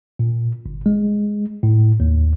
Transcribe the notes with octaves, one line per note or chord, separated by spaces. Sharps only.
A#2
G1
G#3
A2
D#2